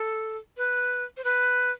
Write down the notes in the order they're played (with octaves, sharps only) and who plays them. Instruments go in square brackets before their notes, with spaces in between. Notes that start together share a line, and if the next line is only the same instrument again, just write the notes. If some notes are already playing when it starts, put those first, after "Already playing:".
Already playing: [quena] A4
B4
C5
B4